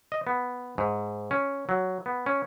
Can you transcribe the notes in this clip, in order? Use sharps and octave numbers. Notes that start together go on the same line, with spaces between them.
D#5
B3
G#2
C#4
F#3
B3
C#4